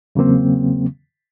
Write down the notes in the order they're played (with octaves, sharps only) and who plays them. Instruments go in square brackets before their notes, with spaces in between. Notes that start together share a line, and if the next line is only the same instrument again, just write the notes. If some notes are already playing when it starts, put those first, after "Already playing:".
[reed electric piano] E2 C#3 F#3 A#3 C4